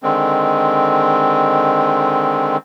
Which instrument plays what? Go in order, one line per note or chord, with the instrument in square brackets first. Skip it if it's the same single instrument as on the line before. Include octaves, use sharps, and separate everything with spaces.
[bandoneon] D3 D#3 G#3 C4